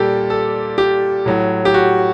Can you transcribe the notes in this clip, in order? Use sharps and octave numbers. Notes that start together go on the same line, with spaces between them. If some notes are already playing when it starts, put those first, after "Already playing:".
Already playing: A#2 G3 G4 A4
A4
G4
A2 F#3
G4
F#4